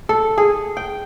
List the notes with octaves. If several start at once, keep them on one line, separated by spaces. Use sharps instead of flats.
A4
G#4
G5